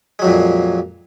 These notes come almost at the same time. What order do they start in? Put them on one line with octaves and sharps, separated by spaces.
G#3 F#3 F2 A#2